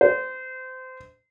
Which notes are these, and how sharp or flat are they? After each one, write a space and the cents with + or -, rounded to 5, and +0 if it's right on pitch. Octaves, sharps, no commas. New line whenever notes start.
C5 -25